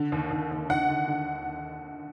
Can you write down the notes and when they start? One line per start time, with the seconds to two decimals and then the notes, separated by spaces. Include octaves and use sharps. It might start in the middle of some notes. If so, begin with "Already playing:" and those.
Already playing: D3
0.12 D#2
0.31 D#2
0.51 D#2
0.69 D#2 F#5
0.89 D3
1.08 D3